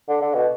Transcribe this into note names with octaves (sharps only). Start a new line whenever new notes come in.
D3
D3
B2